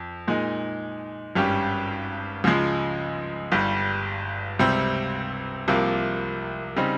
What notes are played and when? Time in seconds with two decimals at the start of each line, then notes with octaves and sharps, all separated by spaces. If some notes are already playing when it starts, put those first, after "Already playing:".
Already playing: F2
0.27 A#2 G#3 D#4
1.35 G#1 G2 G3 C#4 G4
2.44 C#2 C#3 F3 G#3
3.52 G1 G2 G3
4.59 C#2 C3 G3 C4
5.68 C2 C3 F3 A#3 F4
6.76 C#3 G3 C4 D#4